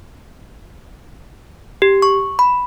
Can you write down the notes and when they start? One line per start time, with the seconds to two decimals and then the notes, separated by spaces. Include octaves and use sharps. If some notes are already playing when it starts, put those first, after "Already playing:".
1.82 G4
2.02 C#6
2.39 B5